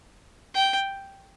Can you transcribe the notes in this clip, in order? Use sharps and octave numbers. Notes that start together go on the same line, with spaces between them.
G5